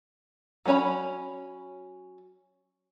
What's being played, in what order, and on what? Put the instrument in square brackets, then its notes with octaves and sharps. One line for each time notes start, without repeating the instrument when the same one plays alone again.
[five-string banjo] F#3 G3 C#4 C#5 B5